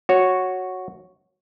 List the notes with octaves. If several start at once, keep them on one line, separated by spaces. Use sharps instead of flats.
F#4 C#5